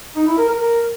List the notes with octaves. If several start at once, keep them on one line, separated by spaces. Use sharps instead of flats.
D#4
E4
A#4
A#4
A#4